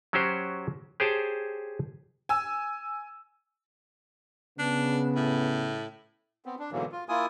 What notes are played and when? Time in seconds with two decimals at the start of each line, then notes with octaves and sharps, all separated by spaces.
0.13 F#3 C#4 F#4 G4 C5
1.00 G4 G#4 C5 C#5 G5 A5
2.29 G#5 E6
4.59 C#3 B3 D4
5.16 A2
6.46 B3 C4
6.59 D4
6.72 G#2 B2 D3 E3 F#3 A#3
6.92 F4
7.09 A#3 E4 F4 G#5 D#6